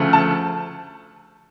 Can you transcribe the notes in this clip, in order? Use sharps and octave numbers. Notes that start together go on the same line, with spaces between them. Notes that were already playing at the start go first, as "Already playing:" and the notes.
Already playing: D2 C#3 F3 A3
A5